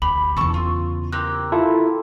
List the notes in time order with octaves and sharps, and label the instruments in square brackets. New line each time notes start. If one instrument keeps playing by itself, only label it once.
[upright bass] D2 [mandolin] G4 [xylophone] B5
[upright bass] E2 C#3 [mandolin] A4 A5 C#6
[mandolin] F4
[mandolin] A#3 C4 G4 [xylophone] F#6
[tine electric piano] E4 F4 A4